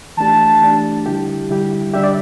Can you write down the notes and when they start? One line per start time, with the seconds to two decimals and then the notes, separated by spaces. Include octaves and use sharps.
0.17 E3 A3 D4 G4 A5
0.61 E3 A3 D4 G4
1.06 D3 G3 E4 G4
1.50 D3 G3 E4 G4
1.93 D3 G3 D4 G4 E5
2.03 D5